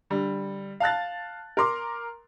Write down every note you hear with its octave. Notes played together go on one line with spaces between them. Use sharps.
D3 G3
F5 A5 F#6 A6
A#4 A#5 C6 D6